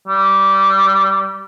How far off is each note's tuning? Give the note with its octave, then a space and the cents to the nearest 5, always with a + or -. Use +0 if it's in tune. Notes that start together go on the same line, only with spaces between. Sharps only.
G3 -15